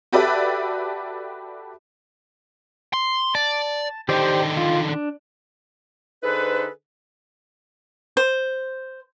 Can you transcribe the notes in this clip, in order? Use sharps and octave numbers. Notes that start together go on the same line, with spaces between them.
F#4 G4 A4 B4 D5 E5
C6
D5 A5
D3 D#3 G4 C5 D5
F4
D4
D3 D#4 G#4 A4 B4 C5
C5